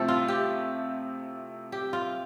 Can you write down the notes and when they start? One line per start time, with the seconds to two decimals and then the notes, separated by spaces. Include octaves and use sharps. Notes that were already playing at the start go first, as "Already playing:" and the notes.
Already playing: C3 F3 A3 C4 E4 A4
0.08 F4
0.28 G4
1.72 G4
1.93 F4